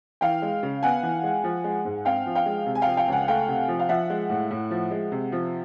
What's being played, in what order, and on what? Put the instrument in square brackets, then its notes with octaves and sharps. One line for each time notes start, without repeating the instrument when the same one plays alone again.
[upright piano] E3 [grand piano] F5 G5
[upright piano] G#3
C#3
[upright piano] B3 [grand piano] F#5 G#5
[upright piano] E3
G#3
F3
G#3
G#2
[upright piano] C4 [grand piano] F5 G5
[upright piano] F3
[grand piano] F5 G5
[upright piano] G#3
C3
[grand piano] G#5
[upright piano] F3 [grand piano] F5 G5
[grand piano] F5 G5
[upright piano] C#2 [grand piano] F#5 G#5
[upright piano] A3 [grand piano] F5 G5
[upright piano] C3
F3
[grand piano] F5
[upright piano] F3 [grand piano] E5 F#5
[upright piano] G#3
A2
A2
F3
G#3
C3
F3